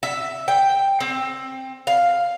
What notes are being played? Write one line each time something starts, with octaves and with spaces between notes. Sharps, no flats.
E5
G5
C4
F5